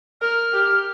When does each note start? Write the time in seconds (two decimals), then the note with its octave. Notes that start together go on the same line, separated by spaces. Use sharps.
0.21 A#4 F6
0.53 G4